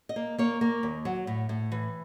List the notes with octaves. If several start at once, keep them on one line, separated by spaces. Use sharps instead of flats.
D#5
A#3
A#3 C#5
A#3
D#2
F#3
A2
A2
E3